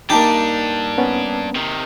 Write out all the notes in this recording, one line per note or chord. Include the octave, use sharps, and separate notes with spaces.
G2 A#3 D4 D#4 G4 A5
B3 C#4
C3 D#3